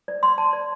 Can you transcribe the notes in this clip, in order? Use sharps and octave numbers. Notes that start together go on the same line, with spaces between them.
D5
C6
A5
D5